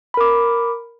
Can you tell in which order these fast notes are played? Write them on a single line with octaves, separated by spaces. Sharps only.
B5 A#4 D6